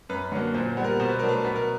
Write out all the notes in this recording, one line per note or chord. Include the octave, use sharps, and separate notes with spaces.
F#2 B4
D3 F#3 A#3
A#2 C5
C5
G3 B3
A#4
B2 C5
B4
F#3 A3 D4 A#4
B4
B2 B4
A#4